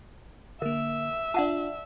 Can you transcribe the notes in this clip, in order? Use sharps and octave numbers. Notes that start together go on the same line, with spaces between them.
D3 A#3 A#4 E5
D4 F4 D5 F#5 A5